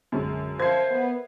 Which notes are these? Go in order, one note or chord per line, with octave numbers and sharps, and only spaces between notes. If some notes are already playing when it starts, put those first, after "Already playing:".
A#1 F#2 D3 G#3 C#4 A5
F3 A#4 C5 E5 G#6 C7
B3